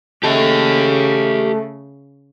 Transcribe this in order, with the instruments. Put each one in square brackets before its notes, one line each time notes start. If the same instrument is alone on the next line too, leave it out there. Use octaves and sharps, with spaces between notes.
[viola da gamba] C#3 [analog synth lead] A3 [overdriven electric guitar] G4 D#5